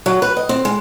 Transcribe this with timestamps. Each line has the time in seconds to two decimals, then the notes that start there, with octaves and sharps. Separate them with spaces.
0.06 F#3
0.22 B4
0.37 D#5
0.49 C4
0.65 G#3